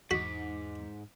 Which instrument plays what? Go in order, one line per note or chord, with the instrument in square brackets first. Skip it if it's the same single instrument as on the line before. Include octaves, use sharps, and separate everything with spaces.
[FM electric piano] E2 D#4 D6 [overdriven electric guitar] G#2 [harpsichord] F#4 [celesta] B6